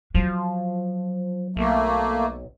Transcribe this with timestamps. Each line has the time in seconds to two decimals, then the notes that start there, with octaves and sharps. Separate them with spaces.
0.14 F3 F#3
1.56 B1 A3 A#3